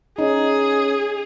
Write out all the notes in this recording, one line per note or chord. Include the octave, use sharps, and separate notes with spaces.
C#4 D#4 G#4